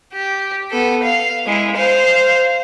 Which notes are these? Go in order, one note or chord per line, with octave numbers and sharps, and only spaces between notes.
G4
B3 A4
F5
G#3 E4
C5 F5